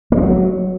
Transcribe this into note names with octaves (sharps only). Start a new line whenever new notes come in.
A#3
G#3
F#3